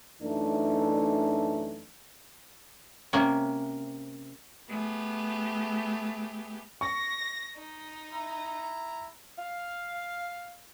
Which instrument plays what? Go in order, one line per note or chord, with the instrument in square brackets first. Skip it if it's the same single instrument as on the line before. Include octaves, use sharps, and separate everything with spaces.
[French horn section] F#2 E3 A3 D4 D#4
[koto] C3 A#3 C#4
[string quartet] A3 B3 G4 G#4
[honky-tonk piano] C#6 [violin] A#6
[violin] D#4
[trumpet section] E4 A#5
[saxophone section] F5